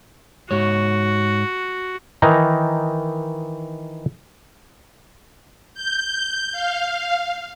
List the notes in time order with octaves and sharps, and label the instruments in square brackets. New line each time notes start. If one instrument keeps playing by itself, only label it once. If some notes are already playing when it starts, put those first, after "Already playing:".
[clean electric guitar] G#2 C#5 [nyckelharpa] F#4
[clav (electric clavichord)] D#3 E3 D#4 A#5
[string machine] G6
F5